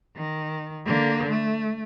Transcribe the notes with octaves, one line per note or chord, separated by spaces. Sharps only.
D#3
D3 A#3
A3